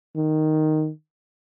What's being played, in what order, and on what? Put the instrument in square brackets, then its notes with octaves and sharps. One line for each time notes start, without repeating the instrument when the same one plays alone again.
[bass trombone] D#3